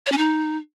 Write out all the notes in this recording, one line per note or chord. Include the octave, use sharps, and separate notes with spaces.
C#5
C#4
D#4